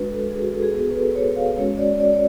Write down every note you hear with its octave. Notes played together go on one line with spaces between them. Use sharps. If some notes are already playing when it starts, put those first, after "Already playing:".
Already playing: G#3 D4 F#4 B4
A4
G#4
F#4
A4
G#4
B3 F#4 G#4
B4
A4
C#5
F5
G#3 C#4 F#4 C#5
D5
D5
C#5